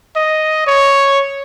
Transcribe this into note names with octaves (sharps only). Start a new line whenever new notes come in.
D#5
C#5